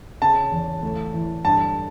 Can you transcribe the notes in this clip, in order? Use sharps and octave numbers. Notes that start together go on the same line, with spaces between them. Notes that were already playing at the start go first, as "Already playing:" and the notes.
C#3 A5
E2
A2
E3
G2 A5